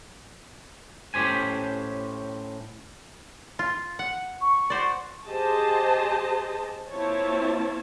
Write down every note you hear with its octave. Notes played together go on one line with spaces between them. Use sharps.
A2 C#4 G4 C5 G#5
F4
F#5
C#6
F#4 C5 D5
G4 G#4 C5 D#5 A5
A#3 C4 E4 F4 C#5 A5